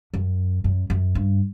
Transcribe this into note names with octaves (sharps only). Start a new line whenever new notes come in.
F#2
F#2
F#2
G2